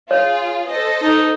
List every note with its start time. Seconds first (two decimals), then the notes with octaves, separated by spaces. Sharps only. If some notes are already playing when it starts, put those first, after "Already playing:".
0.11 F4 G#4 C#5
0.68 A4 C5 D#5
1.02 D#4